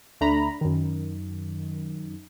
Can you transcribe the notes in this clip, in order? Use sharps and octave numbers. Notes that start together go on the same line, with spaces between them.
D2 A3 D4 A#5 B5
F#2 D#3